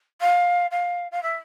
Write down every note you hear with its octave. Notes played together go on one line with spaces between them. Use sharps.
F5
F5
F5
E5